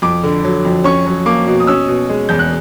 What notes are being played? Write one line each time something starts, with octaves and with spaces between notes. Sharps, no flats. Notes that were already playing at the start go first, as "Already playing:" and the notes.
F2 D6
D3
F#3
F2
C#4 C#6
F#3
A#3 D6
B2
D#6
C#4 E6
B2
G#3
E2 G6
F#6